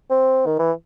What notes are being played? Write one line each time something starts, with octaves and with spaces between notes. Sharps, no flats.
C4
D#3
E3